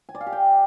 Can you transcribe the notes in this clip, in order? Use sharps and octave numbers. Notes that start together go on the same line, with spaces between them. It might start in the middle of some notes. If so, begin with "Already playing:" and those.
G#5
D5
F5
G4
G5